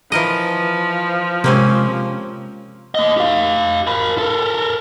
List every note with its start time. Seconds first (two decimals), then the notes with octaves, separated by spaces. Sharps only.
0.12 E3 F3 A#4 D#5
1.44 C3 G#3 A#3 C4 C#4
2.95 A#3 D#5
3.17 G4 F5
3.87 A#4 B5
4.18 A4 A#4